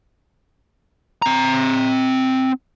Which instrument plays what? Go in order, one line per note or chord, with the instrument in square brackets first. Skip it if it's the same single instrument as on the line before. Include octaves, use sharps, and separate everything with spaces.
[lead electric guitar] C4 A#5